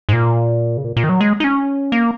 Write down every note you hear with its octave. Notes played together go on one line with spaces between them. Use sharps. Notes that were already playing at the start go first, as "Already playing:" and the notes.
G#2
A#2
C#3
A#2
A#2
D#3
F#3
G#3
D#4
C#4
A#3